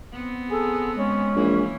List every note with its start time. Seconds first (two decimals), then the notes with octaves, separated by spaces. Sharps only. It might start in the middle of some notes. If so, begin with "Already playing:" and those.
0.12 B3 C4
0.50 G#4 A4
0.97 G#3 C#4
1.36 A#1 E3 A#3